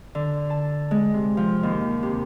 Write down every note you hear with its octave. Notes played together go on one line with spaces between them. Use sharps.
D3
A5
G#3
C3
F3
D#2
C3